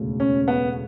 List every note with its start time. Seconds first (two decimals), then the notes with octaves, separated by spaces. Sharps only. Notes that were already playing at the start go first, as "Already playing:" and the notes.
Already playing: E1 D2 C#3
0.20 C#4
0.48 B3